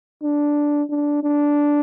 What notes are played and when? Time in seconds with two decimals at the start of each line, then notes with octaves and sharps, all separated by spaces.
0.23 D4
0.90 D4
1.23 D4